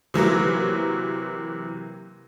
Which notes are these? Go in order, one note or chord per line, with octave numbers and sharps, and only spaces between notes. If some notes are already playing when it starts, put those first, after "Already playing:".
C3 E3 F#3 A#3